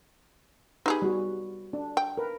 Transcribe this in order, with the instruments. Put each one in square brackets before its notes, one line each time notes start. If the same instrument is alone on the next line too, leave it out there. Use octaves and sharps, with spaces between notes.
[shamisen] D#4 G4 G#4 [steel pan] B4
[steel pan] G3 F#4
D4
[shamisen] G5
[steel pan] A#4 B4